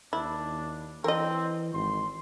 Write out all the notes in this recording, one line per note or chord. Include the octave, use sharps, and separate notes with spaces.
D#2 D4 E4
E3 C4 A#4 D#5
G#1 C6